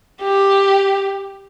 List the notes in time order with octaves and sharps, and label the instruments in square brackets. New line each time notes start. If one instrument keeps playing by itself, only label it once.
[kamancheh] G4